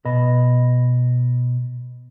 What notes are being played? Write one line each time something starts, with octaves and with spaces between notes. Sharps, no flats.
B2 D#5 B5